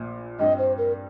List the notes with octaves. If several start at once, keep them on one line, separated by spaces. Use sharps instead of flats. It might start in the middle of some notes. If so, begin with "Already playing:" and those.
Already playing: A#1 A#2
G2 G3 C4 D#5
C5
A#4